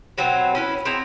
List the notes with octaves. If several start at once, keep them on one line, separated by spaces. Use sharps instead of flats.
B2 F#3 B3 C4
C#4 E4 B4
C4 E4 G#4 A#5